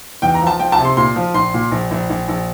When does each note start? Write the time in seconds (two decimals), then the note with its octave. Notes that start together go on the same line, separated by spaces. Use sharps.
0.22 E2 G5
0.34 A#5
0.41 F3
0.47 A5
0.59 F3 G5
0.72 A5
0.78 C3
0.85 C6
0.97 A#2 C6
1.16 F3
1.34 A#1 C6
1.54 A#2
1.71 A#1
1.91 A#1
2.10 A#1
2.28 A#1